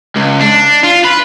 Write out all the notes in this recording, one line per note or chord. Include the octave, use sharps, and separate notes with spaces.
C#2
D4
F4
B4